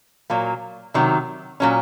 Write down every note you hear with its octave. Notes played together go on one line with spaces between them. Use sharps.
A#2 F#3 A#3
C3 D#3 F#3
A#2 F#3 C#4